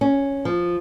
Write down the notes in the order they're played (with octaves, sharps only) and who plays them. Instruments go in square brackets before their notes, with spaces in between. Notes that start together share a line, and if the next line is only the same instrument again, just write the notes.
[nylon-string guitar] C#4
F3